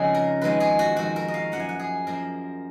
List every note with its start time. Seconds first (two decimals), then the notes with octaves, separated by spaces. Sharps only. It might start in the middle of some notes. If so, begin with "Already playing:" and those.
Already playing: F2 C#3 G#3 D#4 G#4
0.14 A#4
0.42 F2 D#3 G#3 B4
0.60 G#4
0.79 F#4
0.96 F2 D#3 G#3 F#4
1.16 A#4
1.28 D#5
1.34 F5
1.52 F#2 F3 A#3 F#5
1.60 G#5
1.69 F#5
1.79 G#4
2.07 F#2 F3 A#3 A#4